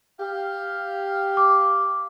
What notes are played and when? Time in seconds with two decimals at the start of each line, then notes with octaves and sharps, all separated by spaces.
0.20 G4 F5
1.37 D6